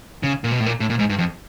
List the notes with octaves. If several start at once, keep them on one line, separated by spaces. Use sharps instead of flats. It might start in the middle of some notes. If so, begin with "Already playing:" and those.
C#3
A#2
B2
A2
A#2
A2
A#2
G#2
G2
F2